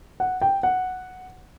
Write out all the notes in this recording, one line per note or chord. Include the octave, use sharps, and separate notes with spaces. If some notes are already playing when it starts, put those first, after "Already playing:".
F#5
G5
F#5